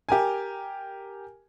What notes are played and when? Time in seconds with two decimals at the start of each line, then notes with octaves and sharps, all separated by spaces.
0.09 G4 A#4 G#5